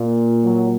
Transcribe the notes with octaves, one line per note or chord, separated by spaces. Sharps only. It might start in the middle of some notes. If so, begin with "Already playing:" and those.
Already playing: A#2
F#3